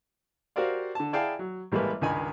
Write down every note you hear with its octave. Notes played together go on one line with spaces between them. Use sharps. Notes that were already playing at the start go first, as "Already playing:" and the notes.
F#4 G4 A#4 C5 D5 F5
D3 A5
E4 G#4 D5 F5 G5 A5
F#3
A1 G3 G#3 A#3 B4
C#2 G2 D#3 D#4 G#5 B5